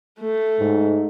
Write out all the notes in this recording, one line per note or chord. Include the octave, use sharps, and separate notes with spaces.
A3
G#2